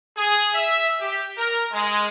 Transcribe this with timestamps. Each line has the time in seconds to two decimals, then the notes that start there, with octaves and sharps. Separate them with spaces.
0.17 G#4
0.54 E5
1.01 G4
1.38 A#4
1.72 G#3